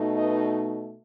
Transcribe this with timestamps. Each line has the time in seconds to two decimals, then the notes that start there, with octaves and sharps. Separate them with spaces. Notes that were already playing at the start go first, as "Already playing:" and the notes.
Already playing: B2 A3 D#4
0.16 B4 D#5